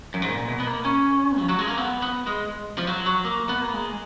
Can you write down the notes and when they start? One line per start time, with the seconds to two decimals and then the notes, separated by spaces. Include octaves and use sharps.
0.14 F#2
0.22 G#2
0.31 A#2
0.48 B2
0.60 B3
0.66 A#3
0.85 C#4
1.39 F3
1.49 F#3
1.59 G#3
1.67 A#3
1.78 B3
2.02 B3
2.27 G#3
2.78 F3
2.87 F#3
3.06 F#3
3.25 A#3
3.49 B3
3.61 A#3
3.74 G#3